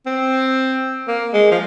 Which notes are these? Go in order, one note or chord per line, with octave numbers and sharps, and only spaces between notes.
C4
A#3
G#3
F3